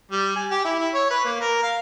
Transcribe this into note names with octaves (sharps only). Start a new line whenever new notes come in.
G3
G#5
G4
E4
E4
C#5
B4
A#3
A#4
F5